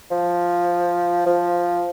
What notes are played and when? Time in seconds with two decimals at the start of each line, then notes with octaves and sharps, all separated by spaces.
0.11 F3
1.26 F3